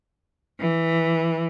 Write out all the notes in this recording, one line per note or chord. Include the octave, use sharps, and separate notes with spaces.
E3